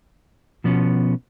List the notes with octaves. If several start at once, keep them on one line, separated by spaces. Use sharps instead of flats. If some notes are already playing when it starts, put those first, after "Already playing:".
B2 F3 B3 C#4